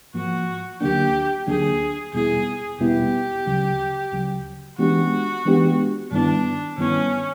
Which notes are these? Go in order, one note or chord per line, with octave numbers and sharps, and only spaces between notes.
G#2 F3 A#3 F#4
D2 D3 F#3 A#3 D4 G4
D2 D3 F#3 A#3 D4 G#4
E2 B2 G3 B3 E4 G#4
E2 B2 G3 B3 E4 G4
D2 C#3 F#3
D2 C#3 F#3
E3 G#3 B3 D4 F#4 G4
E3 G#3 B3 D4 G4
G2 D#3 G3 B3 D4 E4
G2 D#3 G3 B3 C#4 E4